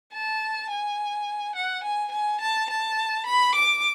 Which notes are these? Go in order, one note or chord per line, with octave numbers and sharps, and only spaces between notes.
A5
G#5
F#5
G#5
G#5
A5
A5
B5
D6